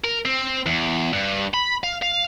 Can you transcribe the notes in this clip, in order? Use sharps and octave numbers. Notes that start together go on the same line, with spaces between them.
A#4
C4
E2
G2
B5
F5
F5